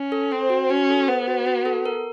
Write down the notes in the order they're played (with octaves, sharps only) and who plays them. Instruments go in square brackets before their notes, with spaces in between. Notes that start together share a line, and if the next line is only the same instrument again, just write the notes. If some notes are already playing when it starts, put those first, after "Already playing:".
Already playing: [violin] C#4
[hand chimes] A4
[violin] C4 [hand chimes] C5
[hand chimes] F#4
[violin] C#4 [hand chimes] F#4
[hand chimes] A4
[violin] B3 [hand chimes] C5
[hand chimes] F#4
F#4
A4
A#4